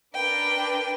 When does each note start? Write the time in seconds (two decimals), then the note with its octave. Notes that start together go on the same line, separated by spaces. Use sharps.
0.14 D4 A#4 B4 G5